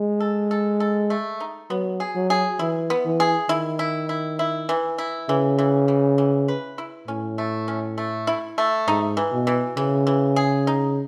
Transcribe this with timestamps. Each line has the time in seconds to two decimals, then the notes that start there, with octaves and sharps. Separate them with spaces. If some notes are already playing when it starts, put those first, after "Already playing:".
Already playing: G#3
0.20 A4
0.51 A4
0.80 A4
1.10 A3
1.40 D#4
1.70 F#3 B3
2.00 G#4
2.15 F#3
2.30 G#4
2.59 E3 E4
2.90 B3
3.05 E3
3.20 G#4
3.49 D#3 E4
3.79 E4
4.09 E4
4.39 E4
4.69 E3
4.98 E4
5.29 C#3 E3
5.59 E3
5.88 E3
6.18 E3
6.48 B4
6.78 E4
7.08 A2 C#4
7.38 A3
7.68 C#4
7.98 A3
8.27 E4
8.58 A3
8.87 G#2 D#4
9.17 E3
9.32 B2
9.47 E3
9.77 C#3 E3
10.07 E3
10.36 G#4
10.67 D#4